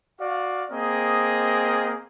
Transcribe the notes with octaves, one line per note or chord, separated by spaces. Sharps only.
F#4 D5 F5
A#3 C4 G#4 A#4 D#5